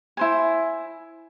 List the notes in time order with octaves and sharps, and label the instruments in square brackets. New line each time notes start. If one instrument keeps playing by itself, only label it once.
[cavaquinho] E4 C5 G#5